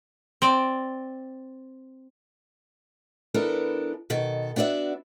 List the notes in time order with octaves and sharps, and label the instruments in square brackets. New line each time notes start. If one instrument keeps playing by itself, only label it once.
[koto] C4 D5
[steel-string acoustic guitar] E3 B3 D4 A4 A#4
B2 D#3 A4
B3 D4 F#4 D5 E5